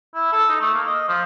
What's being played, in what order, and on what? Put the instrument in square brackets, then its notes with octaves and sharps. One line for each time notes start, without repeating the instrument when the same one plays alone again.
[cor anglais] E4
A4
D#4
A3
A#3
D#5
F3